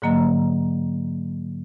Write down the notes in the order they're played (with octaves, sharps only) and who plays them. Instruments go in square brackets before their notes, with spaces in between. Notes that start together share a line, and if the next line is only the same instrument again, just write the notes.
[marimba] G#2 D3 F#3 A#3 D#5 A#5